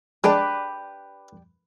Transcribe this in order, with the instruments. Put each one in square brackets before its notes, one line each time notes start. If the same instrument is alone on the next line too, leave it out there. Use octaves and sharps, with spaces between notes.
[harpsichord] G#3 [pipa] D4 G4 [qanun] B4 [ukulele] D5